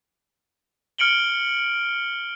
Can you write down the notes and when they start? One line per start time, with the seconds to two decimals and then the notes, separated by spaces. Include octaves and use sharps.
0.98 F6 C#7 D7 F#7 G7